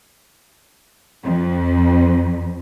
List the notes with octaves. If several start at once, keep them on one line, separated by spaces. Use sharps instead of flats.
F2